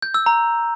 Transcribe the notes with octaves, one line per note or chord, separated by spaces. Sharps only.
G6
E6
A#5